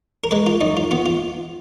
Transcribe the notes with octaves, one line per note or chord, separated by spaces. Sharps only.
A#4
G#3 B4
F4
F#2 D#4
F4
B3 F4
F4